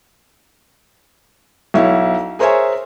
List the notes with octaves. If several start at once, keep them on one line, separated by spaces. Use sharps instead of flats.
B1 E4 C#5 F5
G#4 A#4 C5 C#5 E5 G#5